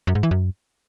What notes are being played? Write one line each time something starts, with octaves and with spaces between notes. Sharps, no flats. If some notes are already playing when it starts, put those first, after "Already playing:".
F#2
G#2
E3
F#2